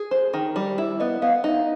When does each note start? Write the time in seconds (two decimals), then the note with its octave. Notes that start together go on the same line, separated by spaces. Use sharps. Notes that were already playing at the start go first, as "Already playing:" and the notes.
Already playing: G#4
0.11 C5
0.34 D#3
0.56 G3
0.78 E4
1.00 B3 D#5
1.22 B3 F5
1.44 D#4 E5